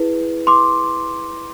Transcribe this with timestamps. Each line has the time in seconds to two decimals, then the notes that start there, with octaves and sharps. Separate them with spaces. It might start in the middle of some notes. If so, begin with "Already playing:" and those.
Already playing: E4 G#4 B4
0.47 C6 D6